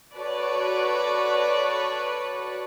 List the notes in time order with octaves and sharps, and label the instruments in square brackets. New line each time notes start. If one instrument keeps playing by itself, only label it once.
[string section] F#4 A4 B4 C#5 D5